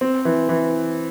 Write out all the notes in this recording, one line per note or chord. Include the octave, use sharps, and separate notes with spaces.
C4
E3
E3